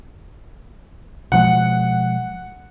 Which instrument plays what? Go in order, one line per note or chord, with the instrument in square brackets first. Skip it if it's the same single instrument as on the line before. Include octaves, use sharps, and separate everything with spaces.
[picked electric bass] B2 F3 G#3 [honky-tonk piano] F#5